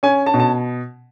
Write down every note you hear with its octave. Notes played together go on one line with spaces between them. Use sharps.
C#4 G#5
A5
B2
A5